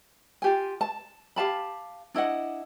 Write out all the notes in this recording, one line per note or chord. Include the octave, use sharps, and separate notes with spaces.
F4 G4 G#5
A5
G4 F5 A5 B5
D4 E4 D#5 F#5